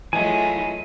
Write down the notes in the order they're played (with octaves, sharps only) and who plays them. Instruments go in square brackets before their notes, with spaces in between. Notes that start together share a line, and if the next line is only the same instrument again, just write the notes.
[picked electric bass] E3 [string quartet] F#3 G#3 A3 [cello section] E4 F4 [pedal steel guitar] G#5